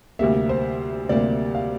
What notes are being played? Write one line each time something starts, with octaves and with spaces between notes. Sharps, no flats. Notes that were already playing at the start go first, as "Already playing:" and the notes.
D2 C3 G3 A#3 E5
C5
D2 C3 G3 A#3 D5
F5